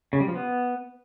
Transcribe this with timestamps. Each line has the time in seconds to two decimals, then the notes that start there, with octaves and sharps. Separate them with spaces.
0.13 C#3
0.20 G3
0.28 F3
0.35 B3